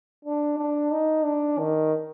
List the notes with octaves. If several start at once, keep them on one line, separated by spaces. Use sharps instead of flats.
D4
D4
D#4
D4
D#3